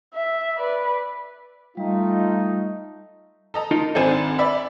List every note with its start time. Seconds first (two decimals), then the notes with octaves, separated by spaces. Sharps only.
0.14 E5
0.58 B4 D5
1.77 G3 A3 D#4 F4
3.54 A4 D#5 A#5
3.71 D#4 F4 A#4
3.95 G#1 C4 D4 A4 C5 G#5
4.38 D5 E5 B5